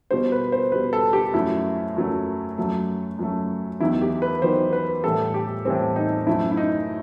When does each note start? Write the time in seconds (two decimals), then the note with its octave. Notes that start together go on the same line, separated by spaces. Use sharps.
0.11 B2 G3 C5
0.32 B4
0.52 C5
0.72 B2 G3 B4
0.93 A4
1.13 G4
1.34 F#2 F#3 A3 E4
1.96 F#2 F#3 A3
2.58 F#2 F#3 A3
3.19 F#2 F#3 A3
3.80 E2 D#3 F#3 E4
4.01 G4
4.22 B4
4.42 E2 D#3 F#3 C5
4.73 B4
5.04 A2 E3 G3 A4
5.34 G4
5.65 A2 E3 G3 C4
5.96 D#4
6.27 F#2 F#3 A3 E4
6.52 E4
6.57 D#4